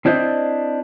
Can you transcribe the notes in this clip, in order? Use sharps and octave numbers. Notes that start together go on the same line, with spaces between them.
C4 D4 E4 C5 D5 D#5